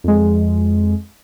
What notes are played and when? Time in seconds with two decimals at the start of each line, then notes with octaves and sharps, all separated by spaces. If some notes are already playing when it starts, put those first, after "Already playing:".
0.04 F2 G#3